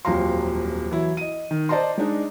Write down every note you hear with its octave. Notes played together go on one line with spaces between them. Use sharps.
D#1 F2 F#3 F5 A#5 C6
E3 F#3 E4
D#5 D#7
D#3
C5 D5 D#5 A5 A#5 C6
G#3 D4 D#4